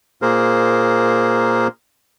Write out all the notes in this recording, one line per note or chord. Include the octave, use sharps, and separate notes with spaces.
A#2 A#3 G#4 A#4 C5